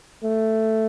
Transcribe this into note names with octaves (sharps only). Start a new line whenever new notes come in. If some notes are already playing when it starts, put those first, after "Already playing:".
A3